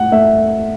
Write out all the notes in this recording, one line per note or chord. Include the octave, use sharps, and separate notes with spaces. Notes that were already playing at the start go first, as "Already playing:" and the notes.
Already playing: A2 F#5
A3 E5